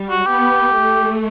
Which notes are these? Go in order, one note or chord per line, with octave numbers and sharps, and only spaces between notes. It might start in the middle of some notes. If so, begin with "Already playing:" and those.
Already playing: G3
F#4
B3 G4
A3